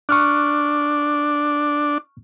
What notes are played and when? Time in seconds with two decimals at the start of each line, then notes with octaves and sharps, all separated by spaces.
0.09 D4 C#6 F6 F#6